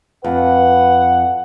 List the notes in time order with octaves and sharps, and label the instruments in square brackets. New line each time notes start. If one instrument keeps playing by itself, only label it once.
[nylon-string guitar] F2 [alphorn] B4 [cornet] F#5